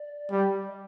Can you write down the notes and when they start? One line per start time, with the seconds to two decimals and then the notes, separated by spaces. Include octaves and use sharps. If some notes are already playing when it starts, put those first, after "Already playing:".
Already playing: D5
0.31 G3
0.67 D#5